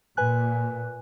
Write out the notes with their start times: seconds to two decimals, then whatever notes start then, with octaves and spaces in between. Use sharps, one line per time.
0.17 A#2 B4 G#5 F#6